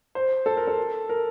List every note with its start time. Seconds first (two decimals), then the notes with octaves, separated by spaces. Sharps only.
0.15 C5
0.46 A4
0.57 A#4
0.67 A4
1.09 A#4